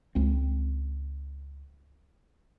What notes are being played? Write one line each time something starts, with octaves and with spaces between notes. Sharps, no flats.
C#2 C4